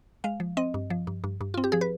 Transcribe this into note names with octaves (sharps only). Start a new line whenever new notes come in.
G#3 F5
F3
C4 D#5
G2
F3
G2
G2
G2
C4 F4
G4
F3 G#4
B4